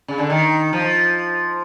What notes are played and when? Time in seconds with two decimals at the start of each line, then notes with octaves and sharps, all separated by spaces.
0.08 C#3
0.18 D3
0.30 D#3
0.73 F3